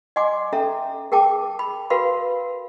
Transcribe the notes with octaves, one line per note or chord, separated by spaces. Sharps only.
D#5 F#5 G#5 C6 D6
C#4 A4 E5 A#5
G#4 A#4 G5 A5 D6
B5
F#4 A#4 B4 F5 B5 C6